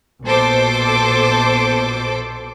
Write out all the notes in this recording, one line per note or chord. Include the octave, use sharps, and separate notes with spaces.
A#1 B2 A4 C5 D6